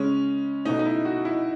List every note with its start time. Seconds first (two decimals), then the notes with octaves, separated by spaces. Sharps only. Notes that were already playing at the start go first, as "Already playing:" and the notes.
Already playing: C#3 G#3 C#4
0.65 B2 A3 D#4
0.79 D#4
0.85 E4
1.05 F#4
1.25 E4